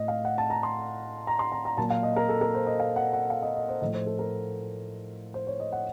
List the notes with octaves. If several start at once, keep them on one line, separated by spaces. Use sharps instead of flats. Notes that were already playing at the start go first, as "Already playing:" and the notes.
Already playing: A2 A3 D#5
F5
F#5
A5
A#5
C6
A#5
C6
A#5
A#5
A#2 F#3 A#3 A5
F5
D#5
A#4
A4
A#4
C5
D#5
F5
F#5
F#5
F5
D#5
D#5
C5
A2 F3 A3 D#5
C5
A4
A#4
C5
C#5
D#5
F#5